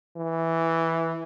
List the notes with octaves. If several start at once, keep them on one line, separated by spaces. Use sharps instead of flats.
E3